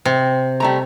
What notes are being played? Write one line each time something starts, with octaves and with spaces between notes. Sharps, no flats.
C3
G3 A3 A#5